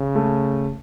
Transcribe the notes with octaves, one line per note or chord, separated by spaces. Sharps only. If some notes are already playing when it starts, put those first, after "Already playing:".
Already playing: C#3
A3